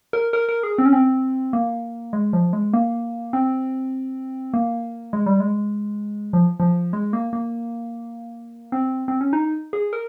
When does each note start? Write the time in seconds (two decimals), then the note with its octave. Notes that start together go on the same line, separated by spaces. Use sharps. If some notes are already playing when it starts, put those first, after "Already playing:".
0.13 A#4
0.33 A#4
0.49 A#4
0.63 G#4
0.78 C4
0.86 C#4
0.93 C4
1.53 A#3
2.13 G#3
2.33 F3
2.53 G#3
2.73 A#3
3.33 C4
4.54 A#3
5.13 G#3
5.26 G3
5.40 G#3
6.33 F3
6.60 F3
6.93 G#3
7.13 A#3
7.33 A#3
8.72 C4
9.08 C4
9.21 C#4
9.33 D#4
9.73 G#4
9.93 A#4